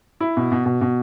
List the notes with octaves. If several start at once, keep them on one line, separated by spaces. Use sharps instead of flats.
E4
B2
B2
B2
B2